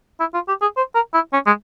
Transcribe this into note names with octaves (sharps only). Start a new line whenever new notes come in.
E4
F4
G4
G#4
C5
A#4
E4
C#4
G#3